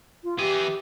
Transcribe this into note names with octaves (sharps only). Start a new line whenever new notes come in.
F4
E3 G4 G#4